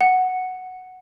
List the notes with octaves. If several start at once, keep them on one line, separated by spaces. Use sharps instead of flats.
F#5